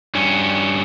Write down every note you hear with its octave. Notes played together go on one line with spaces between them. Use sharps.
G2 C#4